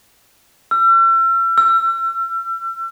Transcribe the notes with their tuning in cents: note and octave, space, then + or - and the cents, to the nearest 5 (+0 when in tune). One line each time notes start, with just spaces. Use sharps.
E6 +40
E6 +35